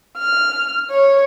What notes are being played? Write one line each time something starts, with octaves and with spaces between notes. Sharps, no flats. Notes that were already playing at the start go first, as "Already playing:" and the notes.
F6
C#5